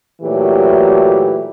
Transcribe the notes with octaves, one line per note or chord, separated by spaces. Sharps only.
A#2 E3 F#3 A3 G4